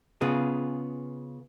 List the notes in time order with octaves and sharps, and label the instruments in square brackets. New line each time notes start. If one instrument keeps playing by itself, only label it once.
[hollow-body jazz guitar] C#3 B3 F4 G#4